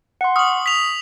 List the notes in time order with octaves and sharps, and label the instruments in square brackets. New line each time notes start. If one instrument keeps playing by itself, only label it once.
[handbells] F#5 C6
[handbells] C#6 F6 [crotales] D#6 F#7
[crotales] B6 F7